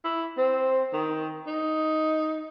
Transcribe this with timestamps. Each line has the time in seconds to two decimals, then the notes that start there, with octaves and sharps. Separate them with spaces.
0.04 E4
0.38 C4
0.93 D#3
1.47 D#4